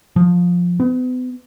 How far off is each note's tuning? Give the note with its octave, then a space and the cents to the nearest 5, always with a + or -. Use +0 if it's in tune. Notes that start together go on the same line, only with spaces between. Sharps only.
F3 +15
B3 +40